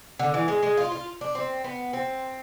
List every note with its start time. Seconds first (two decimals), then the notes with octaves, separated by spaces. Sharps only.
0.19 D3
0.34 E3
0.48 G#3
0.63 G#3
0.77 F4
0.92 F4
1.21 D4
1.35 C4
1.64 B3
1.93 C4